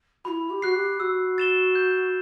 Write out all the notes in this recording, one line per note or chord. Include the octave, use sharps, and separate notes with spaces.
E4 F#4 B5
G4
F#4 F#6 C7
G4
F#4 E6
A6 E7 G7
G6